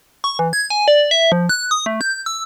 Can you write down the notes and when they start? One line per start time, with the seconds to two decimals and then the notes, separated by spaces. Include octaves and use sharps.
0.24 C#6
0.39 E3
0.53 G#6
0.70 G#5
0.88 D5
1.11 E5
1.32 F3
1.49 F#6
1.71 D#6
1.86 A3
2.01 G6
2.26 E6